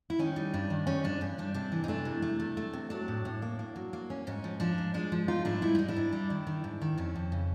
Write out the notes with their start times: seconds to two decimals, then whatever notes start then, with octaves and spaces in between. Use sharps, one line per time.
0.10 E4
0.19 D#3 C#4 D#4
0.36 G3
0.54 G2 D4
0.70 D#3
0.87 G3 C#4 D#4
1.04 G2 D4
1.21 G2 C#4
1.38 G3 D4
1.54 C3 D4
1.72 E3
1.84 D#4
1.88 A3 D4
2.05 C3
2.22 A3
2.40 A3
2.57 A3
2.73 C3
2.90 F#3 D4
3.08 A2
3.25 A2
3.42 A#3
3.59 A#3
3.76 F#3
3.93 A#3
4.10 C#4
4.27 G#2 C#4
4.44 F3
4.60 F3 D4
4.78 G#2
4.94 G#3 D4
5.12 F3
5.28 G#2 D#4 F4
5.45 G#2 D4 E4
5.62 G3 E4
5.75 G3 D#4
5.88 D4 E4
5.97 G#2
6.12 G3
6.30 D#3
6.47 D#3
6.64 G#2
6.82 D#3
6.98 F2 C#4
7.15 F2
7.32 C#3